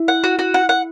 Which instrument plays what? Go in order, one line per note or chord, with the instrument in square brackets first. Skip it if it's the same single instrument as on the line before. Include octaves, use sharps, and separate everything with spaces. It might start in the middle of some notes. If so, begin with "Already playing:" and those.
Already playing: [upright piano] E4
[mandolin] F#5
F#4
F#4
F#5
F#5